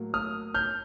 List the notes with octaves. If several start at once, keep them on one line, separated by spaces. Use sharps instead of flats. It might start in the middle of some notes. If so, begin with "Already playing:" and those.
Already playing: A2 F#3 A#3
D#6 F6
F6 G6